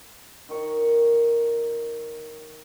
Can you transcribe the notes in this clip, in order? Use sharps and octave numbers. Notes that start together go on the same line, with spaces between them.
D#3 C#5